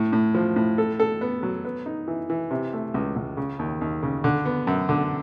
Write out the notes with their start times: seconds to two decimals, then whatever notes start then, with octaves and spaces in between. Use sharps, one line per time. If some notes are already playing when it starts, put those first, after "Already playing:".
Already playing: A2
0.13 A2
0.34 F3
0.56 A2
0.78 A4
1.00 A4
1.21 B3
1.43 F#3
1.65 B3
1.86 D#4
2.08 E3
2.30 E3
2.51 C3
2.73 A3
2.94 C#2
3.16 C#2
3.37 C#3
3.59 D#2
3.81 D#2
4.03 C#3
4.24 D3
4.45 B3
4.67 F#2
4.89 D3